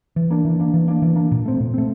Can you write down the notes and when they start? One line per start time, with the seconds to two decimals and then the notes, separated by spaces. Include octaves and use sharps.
0.16 E3
0.30 A#3 D4
0.45 E3
0.60 A#3 D4
0.74 E3
0.88 A#3 D4
1.02 E3
1.16 A#3 D4
1.31 A#2
1.46 A3 C4
1.60 A#2
1.74 A3 C4